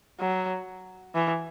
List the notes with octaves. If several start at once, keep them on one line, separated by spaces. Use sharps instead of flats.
F#3
E3